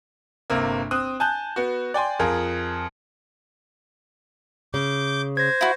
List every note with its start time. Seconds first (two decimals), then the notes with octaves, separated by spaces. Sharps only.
0.50 G1 C3 A#3
0.91 C4 D#6 F#6
1.20 G#5 A5 F#6 G6
1.56 B3 F#4
1.94 D5 G5 G#5 C6
2.19 F2 F4 G#4 A#4
4.74 C#3 D6 G6
5.37 C5 G#6 A#6
5.61 E4 F#4